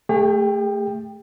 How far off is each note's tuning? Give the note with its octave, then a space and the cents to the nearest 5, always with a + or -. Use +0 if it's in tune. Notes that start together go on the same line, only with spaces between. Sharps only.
A3 +5 G#4 -45 G5 +10